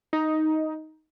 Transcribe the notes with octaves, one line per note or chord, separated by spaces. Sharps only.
D#4